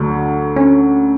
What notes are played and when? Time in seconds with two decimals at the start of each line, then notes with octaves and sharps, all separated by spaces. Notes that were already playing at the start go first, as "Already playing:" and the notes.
Already playing: D2 D3 F#3 D4
0.56 C#4